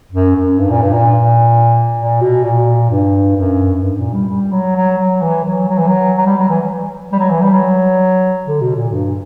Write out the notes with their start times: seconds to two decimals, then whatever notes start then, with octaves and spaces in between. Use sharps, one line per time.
0.12 F#2
0.36 F#2
0.59 G2
0.71 A#2
0.82 G2
0.93 A#2
1.98 A#2
2.21 B2
2.44 A#2
2.90 G2
3.37 F#2
3.74 F#2
3.83 G2
3.99 A#2
4.13 G3
4.29 G3
4.52 F#3
4.75 F#3
4.98 F#3
5.22 E3
5.45 F#3
5.68 F#3
5.78 E3
5.88 F#3
6.17 F#3
6.26 G3
6.38 F#3
6.49 E3
7.12 G3
7.19 F#3
7.30 E3
7.42 G3
7.53 F#3
8.46 D3
8.61 B2
8.76 A#2
8.92 G2